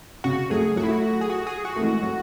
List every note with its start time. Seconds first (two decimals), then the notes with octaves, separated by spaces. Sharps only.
0.24 C#3 F#4
0.50 F#3 A3 G#4
0.76 F#3 A3 F#4
0.83 E4
0.91 F#4
1.21 G#4
1.30 F#4
1.47 G#4
1.65 F#4
1.76 A3
1.81 E3 G#3
2.02 F#3